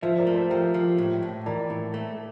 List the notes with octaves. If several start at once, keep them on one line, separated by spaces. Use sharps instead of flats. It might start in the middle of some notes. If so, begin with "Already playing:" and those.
F3 C5 E5
A#4 D5
A3
A4 C5
F3 G4 A#4
F3
A2
A2
E3 A#4 D5
A2
A3